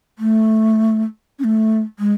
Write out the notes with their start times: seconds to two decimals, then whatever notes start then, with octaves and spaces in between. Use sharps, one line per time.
0.19 A3
1.39 C#4
1.44 A3
1.99 G#3